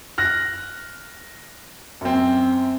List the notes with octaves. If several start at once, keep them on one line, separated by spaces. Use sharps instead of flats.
F6 F#6 A#6
F#2 C4